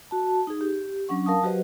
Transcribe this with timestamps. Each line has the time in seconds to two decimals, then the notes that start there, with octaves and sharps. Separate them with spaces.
0.11 F#4 A5
0.47 D#4 G#4
0.61 G4
1.09 F#3 C#4 D4 F#5 C#6
1.26 A#4 F5 A5 D#6
1.43 F#3 F#4 G4 B4 C5 D#5